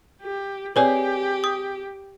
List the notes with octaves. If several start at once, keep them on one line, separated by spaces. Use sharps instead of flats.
G4
C4 G4 G#4 B4 C#5 D5
D#6